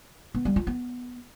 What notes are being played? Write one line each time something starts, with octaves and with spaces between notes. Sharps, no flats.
B3
G3
F4
B3